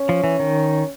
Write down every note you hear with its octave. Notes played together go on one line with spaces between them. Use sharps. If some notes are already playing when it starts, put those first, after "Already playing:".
Already playing: C#4
F3
E3
D#3